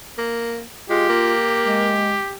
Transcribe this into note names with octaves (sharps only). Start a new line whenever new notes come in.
A#3
G#3 F4 G4
A#3
G#3